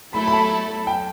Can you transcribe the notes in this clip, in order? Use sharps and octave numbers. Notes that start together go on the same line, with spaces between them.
F#3 A3 E4 A4 B5
B5
A5
G5